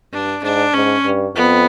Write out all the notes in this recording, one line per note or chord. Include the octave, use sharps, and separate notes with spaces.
G2 D4
G#2 D4
G#2 C#4
G2
F2 B3